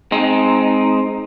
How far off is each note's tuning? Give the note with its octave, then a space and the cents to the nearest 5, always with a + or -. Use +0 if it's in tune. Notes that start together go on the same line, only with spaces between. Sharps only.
G#3 +20 C4 +0 D#4 +0